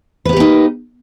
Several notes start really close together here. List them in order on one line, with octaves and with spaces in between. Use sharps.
B4 B3 G4 A#3 D#4